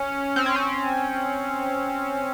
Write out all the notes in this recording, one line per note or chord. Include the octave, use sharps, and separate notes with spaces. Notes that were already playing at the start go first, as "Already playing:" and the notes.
Already playing: C#4
C4
C#4
C4